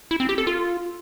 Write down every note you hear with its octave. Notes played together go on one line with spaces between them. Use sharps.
E4
C4
G4
A4
F4